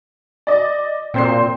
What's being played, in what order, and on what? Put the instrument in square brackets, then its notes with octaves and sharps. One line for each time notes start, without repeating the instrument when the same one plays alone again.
[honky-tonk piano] D5 D#5
[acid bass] A#2 [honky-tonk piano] C4 C5 C7